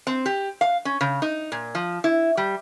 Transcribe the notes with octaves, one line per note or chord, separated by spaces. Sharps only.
C4
G4
F5
C#4
C#3
D#4
A#2
F3
E4
G3